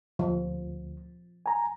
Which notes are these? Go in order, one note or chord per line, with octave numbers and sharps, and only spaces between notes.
D2 F3
G#5 A#5